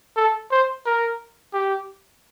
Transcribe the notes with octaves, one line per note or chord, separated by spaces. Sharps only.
A4
C5
A#4
G4